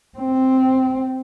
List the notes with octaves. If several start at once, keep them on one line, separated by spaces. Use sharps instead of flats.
C4